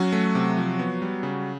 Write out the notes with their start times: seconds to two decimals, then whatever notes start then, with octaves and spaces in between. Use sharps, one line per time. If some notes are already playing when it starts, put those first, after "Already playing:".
Already playing: F#3 C#4 F#4
0.12 A3
0.35 C3
0.57 F3
0.79 B3
1.02 G3
1.23 C#3